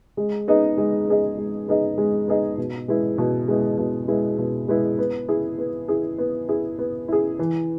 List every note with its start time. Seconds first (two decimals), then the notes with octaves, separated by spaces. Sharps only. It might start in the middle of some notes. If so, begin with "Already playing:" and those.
0.17 G#3
0.48 B3 D#4 G#4 D#5
0.78 G#3
1.07 B3 D#4 G#4 D#5
1.37 G#3
1.68 B3 D#4 G#4 D#5
1.98 G#3
2.28 B3 D#4 G#4 D#5
2.58 B2
2.88 G#3 B3 E4
3.18 B2
3.48 G#3 B3 E4
3.78 B2
4.08 G#3 B3 E4
4.38 B2
4.68 G#3 B3 E4
4.98 B3
5.28 E4 G#4
5.58 B3
5.88 E4 G#4
6.18 B3
6.49 E4 G#4
6.79 B3
7.08 E4 G#4
7.39 E3